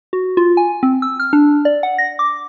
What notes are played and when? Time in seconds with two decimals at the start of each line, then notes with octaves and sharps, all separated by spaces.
0.13 F#4
0.37 F4
0.57 G#5
0.83 C4
1.02 E6
1.20 F6
1.33 D4
1.65 D5
1.83 F#5
1.98 A#6
2.19 D6